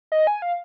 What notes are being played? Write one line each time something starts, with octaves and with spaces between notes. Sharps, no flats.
D#5
G#5
F5